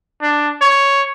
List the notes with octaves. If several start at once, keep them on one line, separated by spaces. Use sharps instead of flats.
D4
C#5